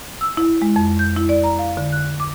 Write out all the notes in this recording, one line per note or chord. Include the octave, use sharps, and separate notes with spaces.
E6
E4
G#3
F2
G6
E4
D5
A#5
F5
D3
F#6
D6